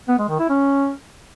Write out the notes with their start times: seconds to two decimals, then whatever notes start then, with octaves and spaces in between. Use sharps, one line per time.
0.08 B3
0.18 G#3
0.29 D#3
0.39 E4
0.49 C#4